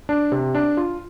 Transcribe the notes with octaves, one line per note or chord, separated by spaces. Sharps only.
D4
C3
D4
F4